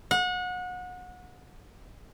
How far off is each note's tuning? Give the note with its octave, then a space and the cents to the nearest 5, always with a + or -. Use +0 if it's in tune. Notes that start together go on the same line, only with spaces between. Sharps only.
F#5 -30